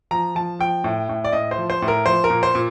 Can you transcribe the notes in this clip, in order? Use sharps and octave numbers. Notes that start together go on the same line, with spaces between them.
F3 A#5
F3 A5
F3 G5
A2
A2
D5
A2 D#5
C5
F3
C5
A2
A#4
F3 C5
A#4
A#2
C5
A#2